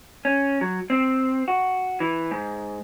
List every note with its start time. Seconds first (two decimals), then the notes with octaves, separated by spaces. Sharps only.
0.25 C#4
0.61 F#3
0.90 C4
1.48 F#4
2.00 E3
2.31 G#2